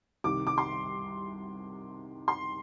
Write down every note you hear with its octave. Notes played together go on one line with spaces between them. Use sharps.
C2 C3 D#3 D6
D6
C6
C6